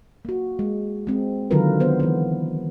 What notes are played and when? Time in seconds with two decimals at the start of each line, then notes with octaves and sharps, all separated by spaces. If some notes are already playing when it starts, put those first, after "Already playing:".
0.25 A#3 F#4
0.59 G#3
1.07 G#3 C4
1.51 D3 D#3 F#3 F4 A#4 B4
1.80 D#3 B3 C5
2.00 E3 B3